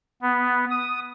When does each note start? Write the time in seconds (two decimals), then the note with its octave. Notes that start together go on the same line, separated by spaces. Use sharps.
0.22 B3
0.71 D#6